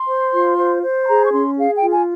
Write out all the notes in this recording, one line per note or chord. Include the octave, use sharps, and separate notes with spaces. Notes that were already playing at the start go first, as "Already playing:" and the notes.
Already playing: C6
C5
F4
C5
C5
C6
G#4 A#5
C#6
C#4 C6
G#4 F5
G5
F4
G#5